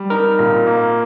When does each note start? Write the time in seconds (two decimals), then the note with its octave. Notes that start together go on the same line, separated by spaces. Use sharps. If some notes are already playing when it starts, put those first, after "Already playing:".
Already playing: G3
0.10 D#4 A#4
0.39 A#2
0.67 A#3